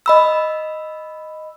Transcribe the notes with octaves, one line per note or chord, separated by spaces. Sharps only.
D#5 B5 E6